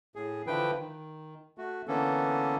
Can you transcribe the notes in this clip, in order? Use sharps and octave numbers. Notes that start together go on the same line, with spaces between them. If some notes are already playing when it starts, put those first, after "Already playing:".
A2 G#4
D3 E3 F3 B4 G5
D#3
A3 F#4
D3 E3 A#3 B3 C#4 A4